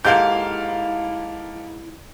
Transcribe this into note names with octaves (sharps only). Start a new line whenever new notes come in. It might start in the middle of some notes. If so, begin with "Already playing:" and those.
G#2 A#3 E4 G4 A4 F5 G6